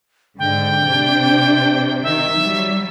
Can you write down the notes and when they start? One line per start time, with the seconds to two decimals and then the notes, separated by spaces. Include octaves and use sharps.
0.39 G#2 D3 G5
0.86 C3 D4
2.03 D#3 E5
2.40 F#3 G3